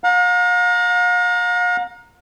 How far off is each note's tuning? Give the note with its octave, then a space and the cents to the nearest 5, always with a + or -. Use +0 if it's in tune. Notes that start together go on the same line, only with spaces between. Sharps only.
F5 +45 A#5 +0